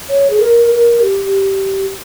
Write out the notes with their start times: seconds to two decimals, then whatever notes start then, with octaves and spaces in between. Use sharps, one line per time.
0.09 C#5
0.30 G#4
0.40 A#4
0.71 A#4
1.02 G4